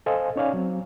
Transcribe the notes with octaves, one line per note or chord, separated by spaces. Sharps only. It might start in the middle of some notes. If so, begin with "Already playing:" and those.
A4 C5 D#5 F5 G#5
C#4 D#4 C#5 D5 F5 G#5
F#3 C4